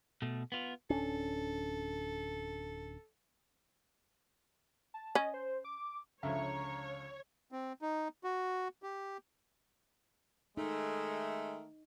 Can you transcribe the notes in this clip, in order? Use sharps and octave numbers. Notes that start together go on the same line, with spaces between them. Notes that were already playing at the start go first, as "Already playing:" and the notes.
B2 A3
B3 F4
D1 C#4 D4 A4
A5
C#4 D#5
C5
D6
C#2 D3 F3 C#5 E5 A#5
C4
D#4
F#4
G4
D#3 G#3 A3 D#4